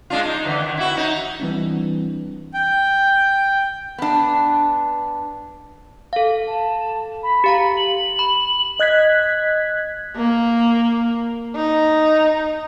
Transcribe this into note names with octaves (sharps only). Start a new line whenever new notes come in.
G#3 D4 F4
D#4
D3 E3
D#3
E4 F#4
D#4
E3 G3 C4 D4
G5
B3 D4
A4 F5
A5
B5
G4 F5 A#5
F#7
B5
D#5 F#6 G#6 B6
A#3
D#4